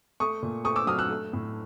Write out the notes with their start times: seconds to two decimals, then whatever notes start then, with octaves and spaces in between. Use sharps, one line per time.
0.20 A3 C#6 D#6
0.43 A#2
0.65 A3 C#6 D#6
0.76 D6 E6
0.87 F#3 D#6 F6
0.99 E6 F#6
1.10 A3
1.33 A2